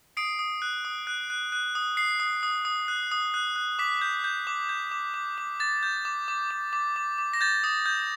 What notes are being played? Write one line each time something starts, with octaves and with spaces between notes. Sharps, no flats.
D#6 C7 D7
D#6
F#6
D#6
F#6
F#6
F#6
D#6
D#6 C7
D#6
D#6
D#6
F#6
D#6
F#6
F#6
D6 B6
G6
G6
D6
G6
D6
D6
D6
D6 A6
G6
D6
D6
D6
D6
D6
D6
A#6
G6 A6
D#6
G6